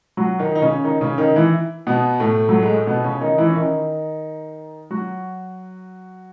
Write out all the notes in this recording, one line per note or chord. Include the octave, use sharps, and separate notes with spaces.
F#3 F#4
D#3 D#4
D#4
C#3 C#4
D#3 D#4
C#3 C#4
D#3 D#4
E3 E4
B2 B3
A2 A3
F#3
G#3
A3
B2 B3
C#3 C#4
D#3 D#4
E3 E4
C#4
D#3 D#4
F#3 F#4